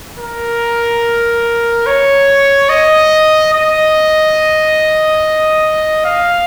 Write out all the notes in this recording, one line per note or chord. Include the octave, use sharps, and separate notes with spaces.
A#4
C#5
D#5
D#5
F5